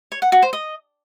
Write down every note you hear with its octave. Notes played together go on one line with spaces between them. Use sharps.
C#5
F#5
F#4
C5
D#5